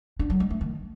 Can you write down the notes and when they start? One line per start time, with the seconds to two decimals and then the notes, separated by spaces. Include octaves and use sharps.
0.19 D4
0.30 F#3
0.40 G#3
0.50 A3
0.61 D#3